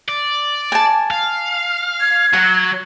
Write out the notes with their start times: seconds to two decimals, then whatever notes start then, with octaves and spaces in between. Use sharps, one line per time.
0.09 D5
0.72 G#5 A5
1.11 F5
2.00 G#6
2.33 F#3 F#5